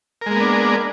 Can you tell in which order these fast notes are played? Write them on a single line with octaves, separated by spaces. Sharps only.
A#4 G#3 A#3 B3 D4